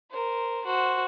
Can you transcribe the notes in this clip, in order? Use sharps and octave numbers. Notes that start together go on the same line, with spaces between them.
A#4 C5
F#4 C5